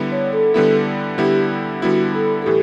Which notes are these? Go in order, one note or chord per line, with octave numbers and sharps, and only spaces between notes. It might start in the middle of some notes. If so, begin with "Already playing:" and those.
Already playing: D3 G3 B3 E4
C#5
A4
D3 G3 B3 E4 A4
D3 G3 B3 E4 G4
D3 G3 B3 E4 F#4
A4
A4
A2 E3 G4